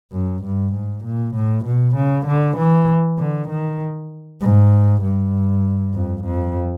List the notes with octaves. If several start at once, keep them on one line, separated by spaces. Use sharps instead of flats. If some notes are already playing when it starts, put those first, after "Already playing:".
F#2
G2
G#2
A#2
A2
B2
C#3
D3
E3
D3
D#3
G#2
G2
F2
F2